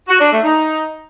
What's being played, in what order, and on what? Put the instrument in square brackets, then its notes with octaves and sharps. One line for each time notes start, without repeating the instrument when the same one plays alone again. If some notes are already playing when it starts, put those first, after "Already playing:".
[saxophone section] F#4
D4
A3
D#4